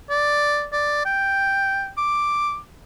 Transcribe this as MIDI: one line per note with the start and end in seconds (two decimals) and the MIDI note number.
0.10 0.66 74
0.72 1.05 74
1.05 1.90 79
1.97 2.58 86